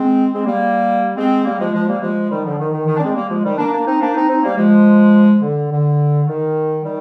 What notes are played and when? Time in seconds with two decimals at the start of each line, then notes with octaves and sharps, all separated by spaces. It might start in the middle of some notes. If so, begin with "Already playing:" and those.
Already playing: G#3 C4
0.32 G#3 C4
0.45 G3 A#3
1.16 G#3 C4
1.45 G3 A#3
1.58 F3 G#3
1.73 F3 G#3
1.88 G3 A#3
2.01 F3 G#3
2.30 D#3 G3
2.44 D3 F3
2.58 D#3
2.72 D#3
2.87 D#3
2.96 D4
3.01 G#3 C4
3.15 G3 A#3
3.29 F3 G#3
3.43 D#3 G3
3.57 A#3 D4
3.72 A#3 D4
3.86 C4 D#4
4.00 A#3 D4
4.14 C4 D#4
4.28 C4 D#4
4.43 G3 A#3
4.57 F3 G#3
5.42 D3
5.71 D3
6.27 D#3
6.84 D#3 G3